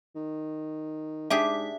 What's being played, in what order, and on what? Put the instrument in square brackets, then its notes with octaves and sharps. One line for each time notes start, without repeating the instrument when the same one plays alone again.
[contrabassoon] D#3
[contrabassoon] G#2 [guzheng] D4 G4 G#4 [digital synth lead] E5